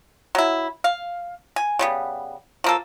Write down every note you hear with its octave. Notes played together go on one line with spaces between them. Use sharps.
F#3 E4
F5
G#5
C#3 G3 B3
F3 A#3 A4